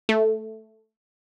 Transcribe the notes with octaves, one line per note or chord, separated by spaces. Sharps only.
A3